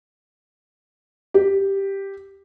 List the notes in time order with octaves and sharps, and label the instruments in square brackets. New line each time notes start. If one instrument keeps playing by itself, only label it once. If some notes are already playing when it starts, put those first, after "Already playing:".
[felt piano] G4